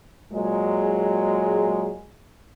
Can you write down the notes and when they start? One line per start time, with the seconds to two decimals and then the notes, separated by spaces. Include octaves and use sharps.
0.32 A#2 F#3 G#3